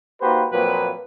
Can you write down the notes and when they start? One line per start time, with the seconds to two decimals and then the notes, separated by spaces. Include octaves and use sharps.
0.20 A#3 D#4 F#4 G4 B4 C5
0.50 A#2 F3 F#3 A#3 C4 B4